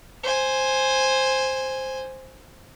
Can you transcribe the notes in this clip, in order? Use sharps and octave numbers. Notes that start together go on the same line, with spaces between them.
C5 G#5